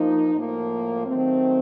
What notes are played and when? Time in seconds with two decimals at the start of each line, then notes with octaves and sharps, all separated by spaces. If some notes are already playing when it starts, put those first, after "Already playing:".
Already playing: F3 A#3 D#4
0.34 A2 F3 A#3
1.06 D#3 F#3 A3 C4